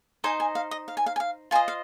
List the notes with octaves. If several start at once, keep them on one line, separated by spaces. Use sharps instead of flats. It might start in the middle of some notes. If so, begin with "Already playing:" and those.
D#4 C5 D#5 G#5
G#5
F5
D#5
F5
G#5
F5
G#5
F5
F4 C5 D#5 G#5
F5